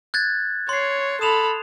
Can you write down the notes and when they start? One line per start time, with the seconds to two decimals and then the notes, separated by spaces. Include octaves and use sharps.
0.14 F#6 G#6 A6
0.69 C#5 C6 C7
1.21 A4 B5 D#6 E7 F7